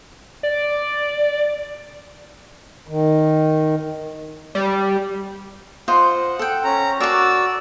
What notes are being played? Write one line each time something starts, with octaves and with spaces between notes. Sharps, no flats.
D5
D#3
G3
F4 C5 D#5 F#5
A4 G5
C#4 A#5
F#4 A#4 D5 A5 E6